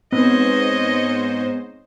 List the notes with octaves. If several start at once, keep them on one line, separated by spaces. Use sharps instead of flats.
G#2 B3 C4 C5 C#5 D#5